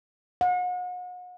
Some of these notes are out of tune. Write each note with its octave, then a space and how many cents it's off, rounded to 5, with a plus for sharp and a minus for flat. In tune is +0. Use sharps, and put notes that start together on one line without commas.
F#5 -40